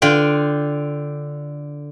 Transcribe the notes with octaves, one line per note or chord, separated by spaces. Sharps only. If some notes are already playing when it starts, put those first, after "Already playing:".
D3 F4 G5